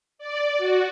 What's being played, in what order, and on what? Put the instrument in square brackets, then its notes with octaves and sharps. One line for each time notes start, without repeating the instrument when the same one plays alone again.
[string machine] D5
F#4